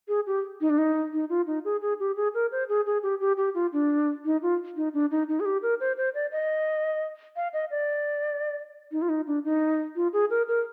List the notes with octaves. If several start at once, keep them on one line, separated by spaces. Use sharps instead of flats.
G#4
G4
D#4
D4
D#4
D#4
F4
D#4
G#4
G#4
G4
G#4
A#4
C5
G#4
G#4
G4
G4
G4
F4
D4
D#4
F4
D#4
D4
D#4
D#4
G#4
G4
A#4
C5
C5
D5
D#5
F5
D#5
D5
D#4
F4
D#4
D4
D#4
F4
G#4
A#4
A#4